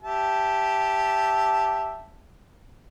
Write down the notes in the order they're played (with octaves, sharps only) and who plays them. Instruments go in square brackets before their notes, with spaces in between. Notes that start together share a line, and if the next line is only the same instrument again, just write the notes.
[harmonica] G4 E5 A5